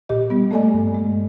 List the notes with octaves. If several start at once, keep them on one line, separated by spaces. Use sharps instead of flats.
A#2 G4 D#5
G3 B3
A3 A#3 A4 D5 D#5 G#5
G2
G#3